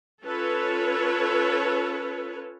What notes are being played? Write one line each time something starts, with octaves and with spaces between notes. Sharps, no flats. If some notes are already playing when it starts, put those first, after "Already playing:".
C#4 F4 A4 B4 C#5